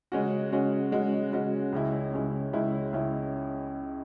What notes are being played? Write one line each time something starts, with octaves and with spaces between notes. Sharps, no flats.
C#3 G#3 C#4 F#4
C#3 G#3 C#4 F#4
C#3 G#3 C#4 F#4
C#3 G#3 C#4 F#4
C#2 C#3 G#3 C#4 E4
C#2 C#3 G#3 C#4 E4
C#2 C#3 G#3 C#4 E4
C#2 C#3 G#3 C#4 E4